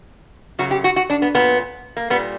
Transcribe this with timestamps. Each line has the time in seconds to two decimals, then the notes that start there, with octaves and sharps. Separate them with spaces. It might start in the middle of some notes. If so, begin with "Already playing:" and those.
0.59 F#2 C#3 F#3 F#4
0.71 G4
0.84 F#4
0.96 F#4
1.10 D4
1.22 B3
1.34 A#2 F#3 B3
1.97 A#3
2.10 A#2 G3 B3